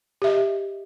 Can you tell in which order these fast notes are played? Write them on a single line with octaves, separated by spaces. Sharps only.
G4 E5 D#5